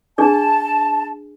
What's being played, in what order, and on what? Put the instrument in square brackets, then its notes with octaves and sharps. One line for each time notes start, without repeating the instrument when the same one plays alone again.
[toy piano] D4 G#4 D5 [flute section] A5